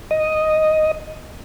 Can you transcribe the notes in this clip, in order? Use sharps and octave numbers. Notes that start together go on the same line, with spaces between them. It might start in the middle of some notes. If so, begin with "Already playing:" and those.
D#5